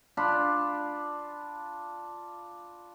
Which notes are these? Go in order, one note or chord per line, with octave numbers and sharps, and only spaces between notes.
D4 F4 B5